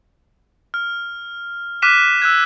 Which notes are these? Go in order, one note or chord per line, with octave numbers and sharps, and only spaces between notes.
F6
D6 F6 F#6 B6 D#7 E7
E6 F#6 G#6